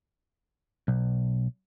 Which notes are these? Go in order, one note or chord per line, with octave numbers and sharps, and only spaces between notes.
B1